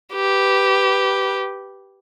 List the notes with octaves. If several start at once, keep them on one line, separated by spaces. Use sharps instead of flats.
G4 B4